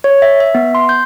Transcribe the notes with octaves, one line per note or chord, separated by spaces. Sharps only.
C#5
E5
E5
B3
C6
G6